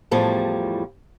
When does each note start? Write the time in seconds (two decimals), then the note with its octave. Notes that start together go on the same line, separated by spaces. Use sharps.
0.11 E2 A2 F3 G3